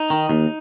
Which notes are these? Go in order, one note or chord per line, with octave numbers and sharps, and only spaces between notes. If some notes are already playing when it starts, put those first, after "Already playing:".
Already playing: D#4
D#3
D#2